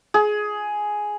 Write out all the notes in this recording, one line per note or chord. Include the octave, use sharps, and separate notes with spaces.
G#4